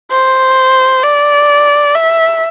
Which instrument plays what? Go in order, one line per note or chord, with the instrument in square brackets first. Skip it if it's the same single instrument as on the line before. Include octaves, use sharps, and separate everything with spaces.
[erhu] C5
D5
E5